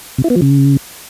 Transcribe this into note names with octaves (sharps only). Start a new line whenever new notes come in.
C3
E4
B3
F3
C#3